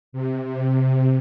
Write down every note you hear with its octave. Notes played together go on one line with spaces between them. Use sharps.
C3
C3